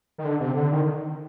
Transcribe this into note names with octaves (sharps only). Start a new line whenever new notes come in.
D#3
D3
C3
D3
D#3